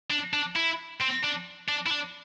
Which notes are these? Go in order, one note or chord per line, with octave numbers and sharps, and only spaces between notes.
D4
D4
E4
C4
D4
D4
E4
D4